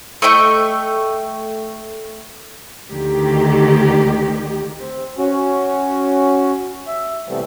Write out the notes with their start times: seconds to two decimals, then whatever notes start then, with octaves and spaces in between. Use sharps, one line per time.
0.22 A3 D#5 G5 C#6
2.91 D2 D#3 G4
4.79 C4
5.18 C#4 F#4
6.87 E5
7.29 C3 E3 G3 A3 B3 C4